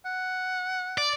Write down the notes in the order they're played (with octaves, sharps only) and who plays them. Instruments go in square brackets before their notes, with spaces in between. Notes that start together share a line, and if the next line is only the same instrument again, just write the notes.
[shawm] F#5
[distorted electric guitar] D5